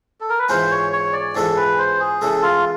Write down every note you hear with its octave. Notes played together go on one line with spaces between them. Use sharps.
A4
A#4
B4
G#2 E3 G#3 C#4 F4 C5
C#5
C#5
D5
G#2 E3 G#3 C#4 F4 A4
B4
C5
G#4
C#3 E3 G#3 A4
F4